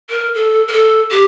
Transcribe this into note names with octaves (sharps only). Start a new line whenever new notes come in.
A#4
A4
A#4
A4
G4